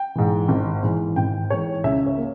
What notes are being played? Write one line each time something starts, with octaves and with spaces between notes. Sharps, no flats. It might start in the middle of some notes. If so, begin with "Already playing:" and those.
Already playing: G5
G#2 E3
G#1
G#2 E3
G#1 G5
G#2 E3 C#5
C#2 E5
C#5
A#3